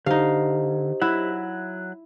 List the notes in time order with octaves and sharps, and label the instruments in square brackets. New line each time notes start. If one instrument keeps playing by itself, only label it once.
[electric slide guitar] D3 [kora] D#4 F5 [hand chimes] G4 C5 D#5
[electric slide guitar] F#3 E5 F#5 [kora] E4